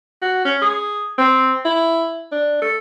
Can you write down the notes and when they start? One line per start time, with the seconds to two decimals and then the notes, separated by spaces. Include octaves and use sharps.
0.22 F#4
0.45 C#4
0.62 G#4
1.18 C4
1.65 E4
2.32 D4
2.62 A4